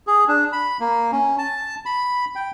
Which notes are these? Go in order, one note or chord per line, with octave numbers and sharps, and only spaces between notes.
G#4
D4
B5
A#3
C#4
A5
B5
G5